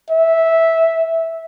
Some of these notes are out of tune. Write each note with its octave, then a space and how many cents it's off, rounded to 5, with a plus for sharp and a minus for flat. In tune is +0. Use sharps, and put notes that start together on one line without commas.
E5 -10